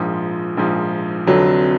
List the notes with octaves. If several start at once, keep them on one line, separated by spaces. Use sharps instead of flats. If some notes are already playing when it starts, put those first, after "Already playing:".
Already playing: A#1 G#2 F3
A#1 G#2 F3
F1 F2 D3 F#3